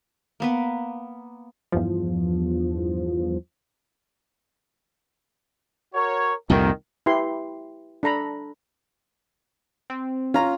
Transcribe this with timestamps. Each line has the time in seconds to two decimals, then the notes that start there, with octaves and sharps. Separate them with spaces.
0.40 A#3 B3 B4
1.72 E2 G2 F3
5.94 F#4 A#4 C#5
6.50 C2 F2 A#2 D#3
7.06 E4 G4 B4 C6
8.03 D4 A4 A#5 B5
9.90 C4
10.34 C#4 F4 A#5